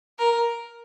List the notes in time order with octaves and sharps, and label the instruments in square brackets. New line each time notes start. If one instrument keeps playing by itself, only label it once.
[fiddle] A#4